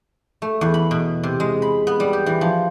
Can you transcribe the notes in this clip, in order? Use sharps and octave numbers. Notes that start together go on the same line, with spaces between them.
A3
E2
B5
B2
C3
G#3
B5
B3
G3
G4
E3
F3